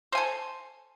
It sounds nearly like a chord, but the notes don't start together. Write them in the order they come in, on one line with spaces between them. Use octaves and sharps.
C5 G#5 A4